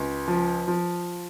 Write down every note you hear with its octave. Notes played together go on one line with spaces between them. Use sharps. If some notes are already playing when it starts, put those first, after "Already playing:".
Already playing: C#2
F3
F3